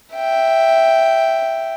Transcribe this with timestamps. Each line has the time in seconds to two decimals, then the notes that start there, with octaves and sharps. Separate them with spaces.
0.16 E5 G5